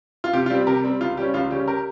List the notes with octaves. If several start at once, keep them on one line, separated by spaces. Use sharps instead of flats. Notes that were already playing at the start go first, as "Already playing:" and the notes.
F4
C3 G4
F4
G3 C4 G4
C3 G4 A#4
G3 C4
C#2 F4
C#3 G3 C#4 G4
C#2 F4
C#3 G3 C#4 G4
G4 A#4